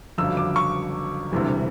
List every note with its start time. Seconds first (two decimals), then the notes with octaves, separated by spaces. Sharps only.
0.18 G1 F2 C#3 F#3 E6
0.37 D6
0.56 C#6
1.32 E1 D2 C3 E3 G3